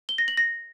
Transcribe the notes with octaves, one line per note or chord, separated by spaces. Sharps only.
G7
A#6
F#7
A#6